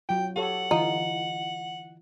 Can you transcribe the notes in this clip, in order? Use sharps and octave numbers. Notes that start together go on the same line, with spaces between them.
F#3 F4 G5
G4 A4 C#5 F#5
D3 E3 D#4 F4